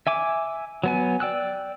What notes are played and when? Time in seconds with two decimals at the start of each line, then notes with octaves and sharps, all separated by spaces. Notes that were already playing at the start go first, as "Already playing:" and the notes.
0.07 E5 G#5 D6
0.84 F#3 B3 G#5
1.20 D5 G5 E6 F#6